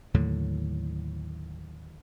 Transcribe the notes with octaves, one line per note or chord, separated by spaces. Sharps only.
D#2 A2 D3 F#3